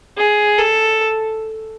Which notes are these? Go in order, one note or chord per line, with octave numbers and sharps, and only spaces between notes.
G#4
A4